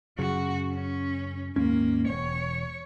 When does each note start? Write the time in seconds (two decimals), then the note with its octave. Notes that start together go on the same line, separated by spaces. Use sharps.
0.19 F#2 C#3 F#4
0.74 C#4
1.56 D#2 G#2 A#3 C#4
2.08 E1 C#5